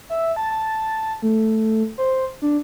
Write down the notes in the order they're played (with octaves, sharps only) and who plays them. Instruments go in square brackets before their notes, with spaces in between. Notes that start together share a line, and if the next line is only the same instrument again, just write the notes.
[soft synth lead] E5
A5
A5
A3
C5
D4